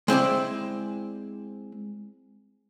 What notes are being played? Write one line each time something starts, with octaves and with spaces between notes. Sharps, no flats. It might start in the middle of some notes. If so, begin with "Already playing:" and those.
G#3 C4 E4 D5